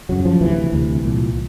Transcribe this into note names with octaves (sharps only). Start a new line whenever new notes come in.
F#2 C#3 F#3
F3
D2 C3 E3
D2 C3
C2 A#2